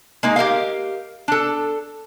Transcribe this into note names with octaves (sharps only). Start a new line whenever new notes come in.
G#3 A#3 D#4
G4 A#4 D#5 F5
D4 A4